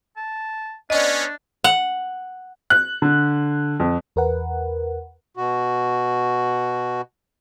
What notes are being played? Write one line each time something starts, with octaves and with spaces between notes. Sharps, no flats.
A5
B3 C#4 D4 D5 D#5
F#5
F#6
D3
F2
E2 A#4 B4 F#5
B2 F#4